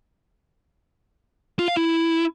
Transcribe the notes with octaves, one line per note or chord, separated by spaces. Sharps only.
F4
F5
E4